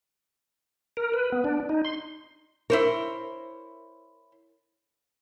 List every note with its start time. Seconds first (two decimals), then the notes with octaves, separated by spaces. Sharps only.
0.97 A#4
1.13 B4
1.32 B3
1.44 D4
1.69 D#4
1.85 C6
2.70 E4 A#4 C5 C#5